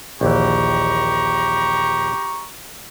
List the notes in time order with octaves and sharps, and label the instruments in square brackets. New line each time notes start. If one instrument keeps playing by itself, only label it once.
[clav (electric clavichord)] A#1 D#2 E3 [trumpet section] G4 A#5 C#6